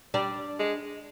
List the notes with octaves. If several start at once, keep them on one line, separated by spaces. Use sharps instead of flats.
G3 D4
G#3